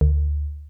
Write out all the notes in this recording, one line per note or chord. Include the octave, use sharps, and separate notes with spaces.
D2